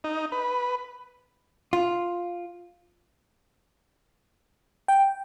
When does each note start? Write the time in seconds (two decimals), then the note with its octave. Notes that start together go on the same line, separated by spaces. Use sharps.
0.04 D#4
0.32 B4
1.73 F4
4.88 G5